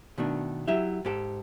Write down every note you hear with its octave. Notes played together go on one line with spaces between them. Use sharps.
B2 D#3 A3 D4
F#3 E4 G4 E5
G#2 G4 A4